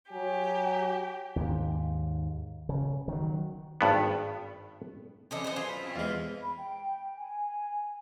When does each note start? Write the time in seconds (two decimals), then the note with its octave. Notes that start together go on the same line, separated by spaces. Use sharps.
0.13 F#3 G4 G#5
1.36 D#2 G#2
2.69 C#3
3.08 D#3 F#3
3.81 G#1 G2 B3
5.31 C3 E3 C4 A4 D#5
5.44 F#2 A4 B4 C5 D#5
5.56 F4 G#4
5.69 B5
5.83 B2 C4
5.96 E2 G#3 F5
6.42 B5
6.56 G5
7.16 G#5